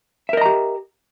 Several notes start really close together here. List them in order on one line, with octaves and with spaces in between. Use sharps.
E5 A#4 D#5 A#5 G4